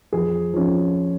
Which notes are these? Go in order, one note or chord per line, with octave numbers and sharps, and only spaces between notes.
F2 G#4
F3 C#4